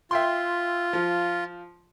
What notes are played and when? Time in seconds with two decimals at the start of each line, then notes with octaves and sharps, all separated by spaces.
0.11 F4 E5 G5 C6
0.93 F3